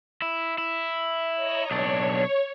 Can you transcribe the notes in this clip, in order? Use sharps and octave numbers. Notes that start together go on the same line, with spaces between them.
E4
E4
C#5 D#5 A#5
B1 D4 C#5